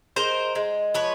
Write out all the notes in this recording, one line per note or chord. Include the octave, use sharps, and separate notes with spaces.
G#3 A#4 C5
G#3
F3 B4 C#5